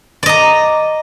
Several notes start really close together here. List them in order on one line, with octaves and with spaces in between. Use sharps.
D5 D#5 A#5